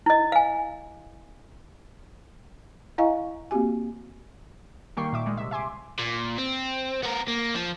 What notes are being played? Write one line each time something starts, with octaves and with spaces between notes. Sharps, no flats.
E4 D#5
F5 G#5
E4 D#5 F5 G#5 A#5 C#6
A#3 C4 F#4 G4 G#5
D#3 G3 A#3 G5 C#6 C7
A#2 E5 D6
G3 G#3
C3 E5
E5 G#5 C6 D6
A#2
C4
B3 A#4
A#3
F3